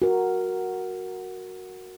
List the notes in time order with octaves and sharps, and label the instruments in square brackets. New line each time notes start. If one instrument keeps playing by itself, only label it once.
[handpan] F#4 A#4